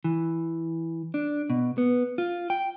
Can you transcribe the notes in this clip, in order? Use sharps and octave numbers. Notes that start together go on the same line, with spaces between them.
E3
D4
B2
B3
F4
G5